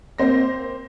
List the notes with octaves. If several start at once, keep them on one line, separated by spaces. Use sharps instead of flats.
A#3 C4 C5 A#6